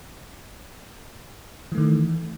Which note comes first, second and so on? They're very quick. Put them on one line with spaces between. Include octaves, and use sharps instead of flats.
E3 A3 D#3